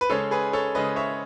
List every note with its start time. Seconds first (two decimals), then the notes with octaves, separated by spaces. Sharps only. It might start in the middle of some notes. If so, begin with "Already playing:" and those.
0.01 B4
0.10 C#3 G#3 C#4 A4 C#5
0.31 G#4 B4
0.53 A4 C#5
0.75 C#3 G#3 C#4 B4 D#5
0.96 C#5 E5